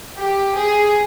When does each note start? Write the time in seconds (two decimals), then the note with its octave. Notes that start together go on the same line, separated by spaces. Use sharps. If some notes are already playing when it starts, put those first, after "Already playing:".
0.17 G4
0.55 G#4